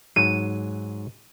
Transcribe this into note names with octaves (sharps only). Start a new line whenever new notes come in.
G#2 F#3 D#7